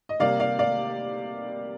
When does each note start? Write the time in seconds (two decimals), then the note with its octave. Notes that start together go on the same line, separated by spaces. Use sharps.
0.09 D#5
0.20 C3 G3 A#3 D5 F5
0.40 D5 F5
0.59 D5 F5